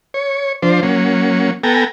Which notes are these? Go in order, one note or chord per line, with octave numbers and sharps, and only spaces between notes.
C#5
F3 D4 C5
F#3 A#3 C#4
B3 A4 G5 G#5 A#5